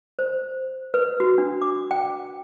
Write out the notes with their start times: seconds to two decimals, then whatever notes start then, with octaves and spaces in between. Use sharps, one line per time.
0.19 C5
0.94 B4
1.20 F#4
1.38 D4
1.62 D6
1.91 G5